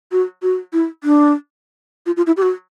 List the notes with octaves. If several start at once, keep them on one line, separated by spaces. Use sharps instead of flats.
F#4
F#4
E4
D4
F4
F4
E4
G4
F#4